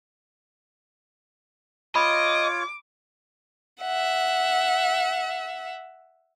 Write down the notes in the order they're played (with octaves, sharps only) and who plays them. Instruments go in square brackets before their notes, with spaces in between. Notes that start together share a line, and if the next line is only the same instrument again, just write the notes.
[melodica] F4 C#5 [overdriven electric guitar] D#5 [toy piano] B5 [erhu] D6
[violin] E5 F#5